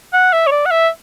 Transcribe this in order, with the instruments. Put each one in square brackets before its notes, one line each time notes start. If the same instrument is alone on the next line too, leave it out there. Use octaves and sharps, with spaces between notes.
[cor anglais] F#5
E5
C#5
D5
F#5
E5